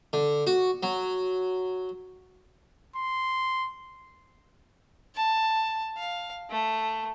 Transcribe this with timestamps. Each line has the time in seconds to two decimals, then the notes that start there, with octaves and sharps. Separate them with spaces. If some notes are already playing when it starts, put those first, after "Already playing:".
0.13 D3
0.47 F#4
0.83 F#3
2.96 C6
5.15 A5
5.97 F5
6.50 A3